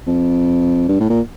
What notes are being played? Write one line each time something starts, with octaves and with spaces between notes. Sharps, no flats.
F2
G2
A2
A#2